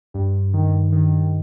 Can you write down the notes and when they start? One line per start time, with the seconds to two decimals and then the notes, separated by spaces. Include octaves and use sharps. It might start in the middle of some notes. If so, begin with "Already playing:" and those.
0.14 G2
0.53 D#3
0.92 D#3